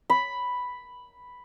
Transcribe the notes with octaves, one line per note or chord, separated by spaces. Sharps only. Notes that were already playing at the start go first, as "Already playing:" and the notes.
B5